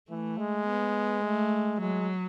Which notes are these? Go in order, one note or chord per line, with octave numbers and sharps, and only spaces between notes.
E3 A3
G#3
B3
A3
F#3 G#3